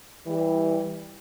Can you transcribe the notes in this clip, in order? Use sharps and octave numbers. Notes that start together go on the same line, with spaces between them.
E3 G3